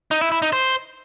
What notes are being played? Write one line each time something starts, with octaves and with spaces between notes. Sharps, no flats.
D#4
E4
E4
D#4
C5